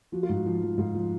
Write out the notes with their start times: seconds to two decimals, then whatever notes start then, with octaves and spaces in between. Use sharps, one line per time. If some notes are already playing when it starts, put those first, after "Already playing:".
0.12 F3 F#4
0.23 F4
0.29 G#2
0.35 F#4
0.46 F3
0.62 F3
0.78 G#2 F4
0.95 F3